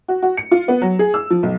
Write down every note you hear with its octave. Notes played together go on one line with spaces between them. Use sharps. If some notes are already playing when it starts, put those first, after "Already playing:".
F#4
F#4
C#7
F4
B3
F#3
G#4
E6
F3
B1